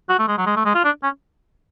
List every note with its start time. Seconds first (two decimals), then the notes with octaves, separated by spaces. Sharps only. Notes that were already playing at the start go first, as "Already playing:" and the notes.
0.09 F#4
0.19 A3
0.28 G#3
0.38 F#3
0.46 G#3
0.56 A3
0.65 G#3
0.75 F4
0.84 D4
1.03 C#4